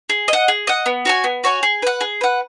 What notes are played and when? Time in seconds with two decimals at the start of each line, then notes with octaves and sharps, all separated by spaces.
0.10 G#4
0.28 D#5
0.33 F#5
0.48 G#4
0.67 D#5 F#5
0.86 B3
1.05 F#4 C#5 G#5
1.24 B3
1.44 F#4 C#5 G#5
1.63 G#4
1.82 B4 F#5
2.01 G#4
2.21 B4 F#5